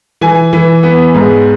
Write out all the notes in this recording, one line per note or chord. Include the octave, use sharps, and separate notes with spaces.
E3 G#5
E3
B3
G#2